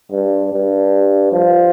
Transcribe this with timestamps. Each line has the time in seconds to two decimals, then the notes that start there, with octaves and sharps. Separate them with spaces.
0.11 G2
0.52 G2
1.32 F3